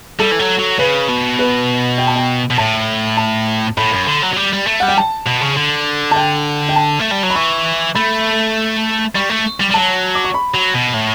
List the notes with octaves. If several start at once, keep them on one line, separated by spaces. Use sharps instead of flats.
G3 A4
E3
F#3
F#3
C#3 B4
B2
B4
G5
A5
G5
B2
A2 A5
A5
A2 B5
F#2
D3
F#3
F#3
G3
G3
A3
G3 F#5
G5
A5
B2
C#3
D3
A5
G5
G5
A5
A3
G3
F#3
B5
E3 C#6
A3 B5
G3 C#6
A3
G3
G3
F#3 A5
D6
C#6
B5
F#3
B2
A2